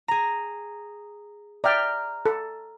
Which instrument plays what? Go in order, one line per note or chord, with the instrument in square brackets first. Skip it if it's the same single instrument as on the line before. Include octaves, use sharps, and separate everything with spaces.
[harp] G#4 A#5
[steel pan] D5 E5 G5 [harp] A#5 F6
[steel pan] A4